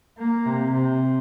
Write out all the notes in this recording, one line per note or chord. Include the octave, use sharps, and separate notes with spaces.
A#3
C3
C3